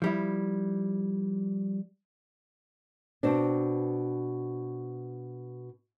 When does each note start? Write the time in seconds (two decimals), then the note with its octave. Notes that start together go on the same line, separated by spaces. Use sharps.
0.02 F3 G3 E4
3.23 B2 C4 D4